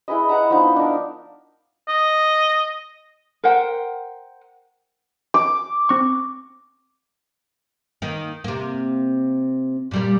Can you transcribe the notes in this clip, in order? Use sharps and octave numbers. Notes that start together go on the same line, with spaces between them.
E4 G#4 B4 D#5
B4 F#5 A5 A#5
F3 B3 D4 D#4
D4 A#4
D#5
A#4 C5 F#5 G5
D6
C4 C#6
D#3 A#3
C3 A#3
A#2 G3 A#3